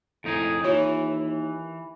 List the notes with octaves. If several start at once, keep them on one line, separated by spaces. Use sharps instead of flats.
F2 A2 D#4 G#4
D#2 E3 F4 C#5